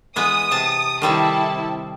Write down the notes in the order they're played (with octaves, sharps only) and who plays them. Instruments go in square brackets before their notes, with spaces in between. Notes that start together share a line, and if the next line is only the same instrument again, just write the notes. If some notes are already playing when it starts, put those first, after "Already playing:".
[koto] E3 G#3 B3 [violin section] D#6
[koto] C3 A5
[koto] D#3 G3 C4 [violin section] E4 A4 A5